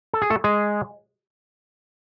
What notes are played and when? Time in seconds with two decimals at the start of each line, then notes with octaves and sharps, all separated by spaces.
0.13 A4
0.22 G#4
0.30 A3 A4
0.44 G#3 G#4